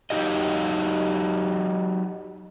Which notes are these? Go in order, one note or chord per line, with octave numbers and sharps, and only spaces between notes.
F#3 D#4 G4 D#5